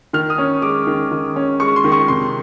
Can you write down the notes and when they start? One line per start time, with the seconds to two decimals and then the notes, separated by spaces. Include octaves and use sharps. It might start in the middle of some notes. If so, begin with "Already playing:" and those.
0.13 D#3 F6
0.30 D#6
0.38 C#4
0.62 G#3 D6
0.87 D#3
1.11 D#3
1.36 C#4
1.60 G#3 C#6
1.76 C6
1.84 D#3
1.92 C#6
2.08 C3 C6